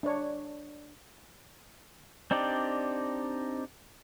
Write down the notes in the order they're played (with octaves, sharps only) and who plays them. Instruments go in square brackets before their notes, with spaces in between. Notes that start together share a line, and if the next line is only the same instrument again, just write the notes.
[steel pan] D4 C#5
[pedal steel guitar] C4 D4 D#4 G4 D5